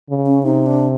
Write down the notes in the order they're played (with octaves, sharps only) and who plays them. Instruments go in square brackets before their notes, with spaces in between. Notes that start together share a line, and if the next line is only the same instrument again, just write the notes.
[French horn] C#3
[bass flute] C#4
[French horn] C3 [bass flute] D#4
[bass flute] D4